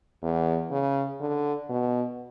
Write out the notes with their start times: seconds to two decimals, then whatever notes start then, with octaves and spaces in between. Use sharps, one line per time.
0.22 E2
0.71 C#3
1.20 D3
1.69 B2